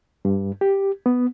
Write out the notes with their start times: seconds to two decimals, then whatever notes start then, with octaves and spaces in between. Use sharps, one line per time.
0.25 G2
0.61 G4
1.06 B3